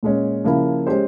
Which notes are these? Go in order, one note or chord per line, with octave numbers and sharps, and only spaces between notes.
A#2 G#3 C#4
C#3 F3 A#3 E4
G#3 C#4 G4 C5